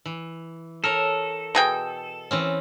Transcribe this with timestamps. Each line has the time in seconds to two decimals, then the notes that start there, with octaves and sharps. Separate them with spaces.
0.06 E3
0.84 A4 A#4 C#5
1.55 B2 G#4 G5
2.31 E3 C4 C#4